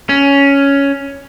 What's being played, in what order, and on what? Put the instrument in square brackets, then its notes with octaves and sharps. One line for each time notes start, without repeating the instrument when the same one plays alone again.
[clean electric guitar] C#4